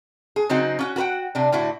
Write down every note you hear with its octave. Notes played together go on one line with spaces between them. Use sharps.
G#4
C#3 F#3 C4 D#4 F#4
C#4 F4 F#4
F#4 A4 B4 F#5 G5
C3 D4
A2 D3 E4 F#4